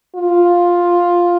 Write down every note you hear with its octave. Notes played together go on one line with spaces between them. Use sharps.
F4